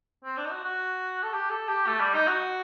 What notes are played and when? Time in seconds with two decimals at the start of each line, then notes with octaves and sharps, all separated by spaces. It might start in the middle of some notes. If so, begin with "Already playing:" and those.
0.24 C4
0.37 D4
0.45 D#4
0.51 F#4
0.64 F#4
1.23 A4
1.33 G4
1.50 A4
1.68 G4
1.87 A3
2.00 G3
2.14 D#4
2.27 F#4